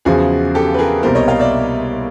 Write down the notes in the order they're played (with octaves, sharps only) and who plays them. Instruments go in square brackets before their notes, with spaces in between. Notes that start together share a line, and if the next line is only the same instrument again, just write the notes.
[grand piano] E2 C#3 F3 [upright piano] F#4 G#4
[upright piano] G4 A4
B4
G#4 A#4
[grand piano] C2 B2 G3 A#3 [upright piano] A#4 C5
[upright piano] C#5 D#5
D#5 F5
D5 E5